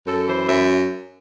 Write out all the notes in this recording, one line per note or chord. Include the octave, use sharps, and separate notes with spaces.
F#2 A4
E3 C5
F#2 E5